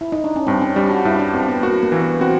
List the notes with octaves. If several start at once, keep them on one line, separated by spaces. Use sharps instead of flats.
E4
D#4
D4
C#4
G2 C4
C#4
G3 D4
F#4
G2 E4
D4
G2 C4
B3
A#3 F#4
A#3
E3
B3
C4 F#4